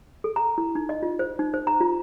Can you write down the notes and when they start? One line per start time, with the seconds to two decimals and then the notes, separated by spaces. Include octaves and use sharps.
0.24 A4
0.36 A#5
0.58 E4
0.75 D#4
0.89 D#5
1.03 F4
1.19 C5
1.39 D#4
1.54 C5
1.67 A#5
1.81 F4